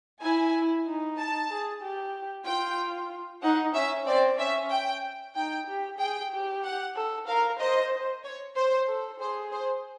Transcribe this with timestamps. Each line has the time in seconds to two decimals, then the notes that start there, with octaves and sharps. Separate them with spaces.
0.22 E4 G#5
0.86 D#4
1.18 A5
1.50 G#4
1.83 G4
2.46 F4 G5
3.43 D#4 F#5
3.75 C#4 E5
4.07 C4 D5
4.39 C#4 E5
4.71 G5
5.35 D#4 G5
5.67 G4
5.99 G#4 G5
6.31 G4
6.63 F#5
6.96 A4
7.27 A#4 F5
7.60 C5 D#5
8.24 C#5
8.56 C5
8.88 A4
9.20 G#4 C5
9.52 C5